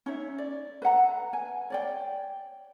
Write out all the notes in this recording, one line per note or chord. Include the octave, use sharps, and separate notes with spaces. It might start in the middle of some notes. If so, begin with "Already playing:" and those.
C#4 D#4 C#5 E5
D5
B4 E5 F#5 A#5
G#5
C#5 D5 G5